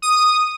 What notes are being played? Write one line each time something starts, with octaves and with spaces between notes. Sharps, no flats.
D#6